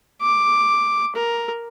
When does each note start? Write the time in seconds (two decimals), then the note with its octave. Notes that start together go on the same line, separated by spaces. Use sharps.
0.21 D6
1.15 A#4